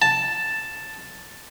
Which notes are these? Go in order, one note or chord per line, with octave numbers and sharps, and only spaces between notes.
A5